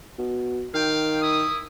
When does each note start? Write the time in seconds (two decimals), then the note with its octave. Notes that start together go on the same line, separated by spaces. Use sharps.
0.19 B2
0.74 D#3 F5 G5
1.21 E4 D#6